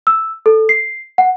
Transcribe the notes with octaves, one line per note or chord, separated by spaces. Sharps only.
E6
A4
C7
F#5